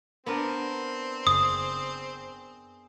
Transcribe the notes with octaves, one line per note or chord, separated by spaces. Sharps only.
B3 C4 D4 A#4
F#1 G#4 D#6